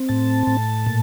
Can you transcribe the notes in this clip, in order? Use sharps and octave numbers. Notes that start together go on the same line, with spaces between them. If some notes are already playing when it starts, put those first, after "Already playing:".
Already playing: C4
A2 A5
A2
A#2